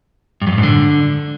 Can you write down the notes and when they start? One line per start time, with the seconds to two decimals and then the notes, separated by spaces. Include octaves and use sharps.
0.41 G2
0.47 F#2
0.52 G2
0.58 G#2
0.63 D3